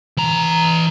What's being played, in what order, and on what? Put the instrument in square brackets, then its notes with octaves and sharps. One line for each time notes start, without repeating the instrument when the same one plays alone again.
[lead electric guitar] E3 A#5